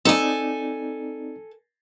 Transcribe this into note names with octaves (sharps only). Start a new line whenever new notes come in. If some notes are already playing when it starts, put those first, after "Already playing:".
C4 D#4 A4 D5 G#5